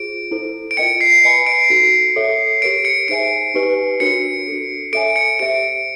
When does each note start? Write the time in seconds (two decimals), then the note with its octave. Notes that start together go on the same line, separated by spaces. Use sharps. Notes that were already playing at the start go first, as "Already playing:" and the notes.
Already playing: F4 G#4 C5 D7
0.31 E4 A4 C5
0.71 D7
0.77 F4 A#4 D#5 G5 C#7
1.01 C7
1.24 B4 D#5 G#5 B5 C#7
1.46 D7
1.70 D#4 F#4 A4
2.16 A4 C#5 E5
2.62 G4 A#4 C#5 D7
2.85 C#7
3.08 D#4 G#4 C5 E5 G#5 D7
3.54 D#4 G4 B4 D#5 G#5
4.00 D4 F#4 A#4 C#5 C#7
4.48 D4 F#4 A4
4.93 A4 C#5 E5 G#5 D7
5.16 C#7
5.39 G4 C5 E5 D7